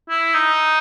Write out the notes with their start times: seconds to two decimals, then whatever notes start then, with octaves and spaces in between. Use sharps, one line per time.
0.09 E4
0.34 D#4